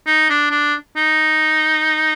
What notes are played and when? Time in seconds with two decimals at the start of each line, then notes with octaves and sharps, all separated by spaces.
0.06 D#4
0.29 D4
0.51 D4
0.96 D#4